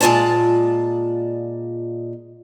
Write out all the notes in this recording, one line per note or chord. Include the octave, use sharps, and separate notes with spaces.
A#2 G#3 F4 D5 A5